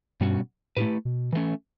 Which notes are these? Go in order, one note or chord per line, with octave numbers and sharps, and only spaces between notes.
G2 B2 G3 C#4 F#4
A2 A3 E4 G4 B4
B2
E3 A3 C#4